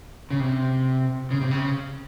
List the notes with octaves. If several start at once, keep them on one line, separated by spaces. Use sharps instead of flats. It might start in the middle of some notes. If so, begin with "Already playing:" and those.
C#3
C3
C#3
C3
C#3